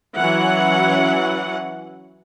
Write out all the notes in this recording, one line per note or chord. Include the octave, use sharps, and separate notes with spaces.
E3 F#3 C#4 F#5